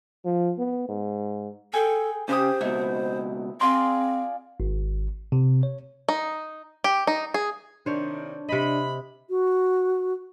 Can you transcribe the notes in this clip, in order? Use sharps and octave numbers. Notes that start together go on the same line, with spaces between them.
F3
B3
G#2
G#4 A4 G5
C#3 G4 C5 C6 D#6
C#2 B2 D#4 E4
C4 F4 G#4 D5 C6
G#1
C3
C#5
D#4
G4
D#4
G#4
C3 D#3 D4 C5 C#5
C3 D#5 B5
F#4